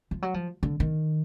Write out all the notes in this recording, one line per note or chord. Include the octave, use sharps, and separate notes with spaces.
F3
F#3
F3
D3
D#3